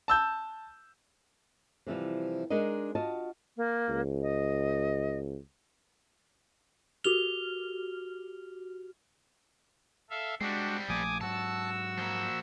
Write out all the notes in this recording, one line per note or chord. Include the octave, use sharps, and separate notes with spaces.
A5 E6 G6
C3 E3 F3 G3
G#3 D4 D#4 A#4 D#5
F4 F#4 D#5 A5
A#3
C#2
D#5
F#4 G4 F6 F7 G7
A4 E5 F5
G3 G#3 C4 D4 F#4
A#1 F3 A3 G#5 D6 D#6
G#2 F#3 F#4 A5 E6
F3 A#3